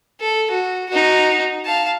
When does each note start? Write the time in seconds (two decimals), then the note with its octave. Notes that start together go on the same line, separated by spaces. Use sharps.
0.20 A4
0.51 F#4
0.90 D#4 F#4
1.65 F5 A5